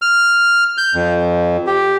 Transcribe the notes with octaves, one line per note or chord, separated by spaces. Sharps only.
F6
G6
F2
G4